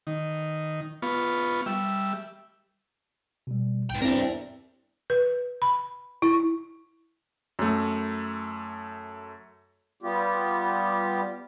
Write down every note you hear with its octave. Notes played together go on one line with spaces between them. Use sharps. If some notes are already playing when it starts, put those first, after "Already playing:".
D#3
B3 F4 C#6
G3 E5
B2 G3
B1 G#2 B3 G5
E2 G2 C4 E4 A#4 D5 E5
B4
B5
E4
F#2 A3
G3 B3 F4 G4